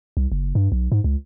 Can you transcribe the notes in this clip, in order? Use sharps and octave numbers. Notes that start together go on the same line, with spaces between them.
C2
F#1
G2
B1
G#2
C#2